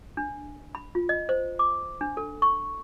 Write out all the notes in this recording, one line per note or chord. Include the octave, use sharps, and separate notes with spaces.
D4
B5
F4
D#5
C5
D6
D4
A4
C#6